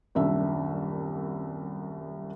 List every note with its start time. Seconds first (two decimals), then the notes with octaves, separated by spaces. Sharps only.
0.15 D#1 C2 F#2 D4 E5